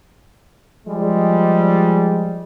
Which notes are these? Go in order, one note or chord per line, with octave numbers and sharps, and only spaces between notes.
F3 G3 G#3